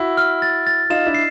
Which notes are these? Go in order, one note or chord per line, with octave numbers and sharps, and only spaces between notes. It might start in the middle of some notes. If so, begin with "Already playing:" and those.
Already playing: E4 F#4
F6
A6
A6
D#4 F4 E7
D4 E4
C7